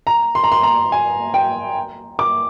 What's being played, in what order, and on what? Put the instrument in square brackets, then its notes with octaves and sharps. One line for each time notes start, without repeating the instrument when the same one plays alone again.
[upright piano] A#5
C6
A#5
C6
A#5
G#5
G5
D6